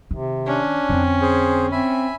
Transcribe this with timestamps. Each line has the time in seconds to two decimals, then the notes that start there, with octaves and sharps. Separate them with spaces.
0.11 C3 D#3
0.47 C#4 D4
0.89 F2 D3 C4
1.21 G#4 C5
1.72 C4 E5 G#5 B5